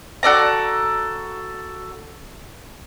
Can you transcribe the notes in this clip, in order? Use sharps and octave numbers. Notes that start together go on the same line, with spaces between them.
F#4 A4 D5 A#5